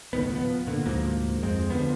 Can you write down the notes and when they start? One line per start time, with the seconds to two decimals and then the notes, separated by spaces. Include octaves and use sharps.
0.13 C#2 A2 D#3 B3
0.33 F3 B3
0.67 A#2 D3
0.86 D2 G#2 F3 A#3
1.43 F2 G#3 C4
1.70 D3 F3 B3